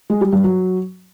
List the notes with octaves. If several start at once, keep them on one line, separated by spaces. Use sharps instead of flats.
G#3
G3
G2
F#3